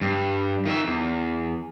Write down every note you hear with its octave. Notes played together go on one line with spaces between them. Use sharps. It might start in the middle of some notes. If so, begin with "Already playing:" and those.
G2
D#3 E5
E2